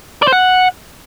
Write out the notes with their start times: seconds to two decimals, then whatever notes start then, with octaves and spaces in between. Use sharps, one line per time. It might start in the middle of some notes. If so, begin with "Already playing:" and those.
0.22 D5
0.28 C5
0.33 F#5